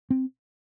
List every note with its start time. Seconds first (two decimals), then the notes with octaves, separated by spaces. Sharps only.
0.10 C4